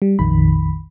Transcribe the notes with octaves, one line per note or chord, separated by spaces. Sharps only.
G3
A#1 F2 D#3 B5